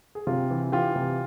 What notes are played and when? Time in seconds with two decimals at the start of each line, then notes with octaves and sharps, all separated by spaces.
0.15 G#4
0.27 C3 F4 G4
0.50 E3
0.72 E3 F4 G4
0.96 C3